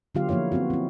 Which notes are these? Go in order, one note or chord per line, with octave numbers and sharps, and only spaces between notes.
D3 F#3 B3 F4 G4 F5
F3 A#3 E4 C#5 F5
B3 C4 F4 F#4
C4 E4